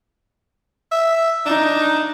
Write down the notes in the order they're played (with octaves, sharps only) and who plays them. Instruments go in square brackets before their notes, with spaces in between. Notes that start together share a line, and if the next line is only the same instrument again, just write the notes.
[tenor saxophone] E5
[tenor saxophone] D4 [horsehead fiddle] D#4